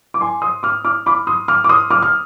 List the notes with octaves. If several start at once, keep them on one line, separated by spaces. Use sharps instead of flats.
D6
G#5 C6
C6 D#6
D6 F6
D6 F6
B5 D6
C6 D#6
D6 F6
D6
C6 D#6
D6 F6
F6